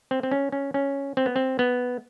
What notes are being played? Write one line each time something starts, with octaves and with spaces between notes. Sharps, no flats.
C4
C4
C#4
C#4
C#4
C4
B3
C4
B3